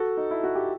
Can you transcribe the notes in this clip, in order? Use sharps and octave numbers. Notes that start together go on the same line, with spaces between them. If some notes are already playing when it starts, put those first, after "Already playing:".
Already playing: F#4 A4
D#4
E4
F#4
G4